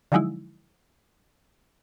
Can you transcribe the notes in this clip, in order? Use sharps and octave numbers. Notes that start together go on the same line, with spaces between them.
D3 F3 F#3 G#3 D#4 E4